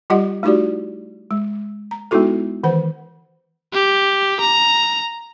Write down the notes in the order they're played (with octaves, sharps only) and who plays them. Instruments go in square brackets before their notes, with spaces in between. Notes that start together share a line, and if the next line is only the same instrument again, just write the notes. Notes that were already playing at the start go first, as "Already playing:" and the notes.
[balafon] G3 F4 G4 D#5 F#5
A3 D#4 E4 F#4 G4 D5
G#3
A#5
G#3 B3 D#4 E4 F#4 A4
D#3 E3 C5 F#5
[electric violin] G4
A#5